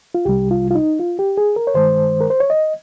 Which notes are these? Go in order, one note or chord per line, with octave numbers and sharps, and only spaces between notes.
F4
C2 C3 G3 G4
F4
F4
D#4
F4
G4
G#4
A#4
C#5
G2 D#3 G#3 C5
A#4
C5
C#5
D#5